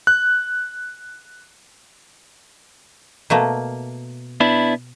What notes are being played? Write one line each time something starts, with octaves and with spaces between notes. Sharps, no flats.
F#6
B2 A3 A#3
B3 D4 E4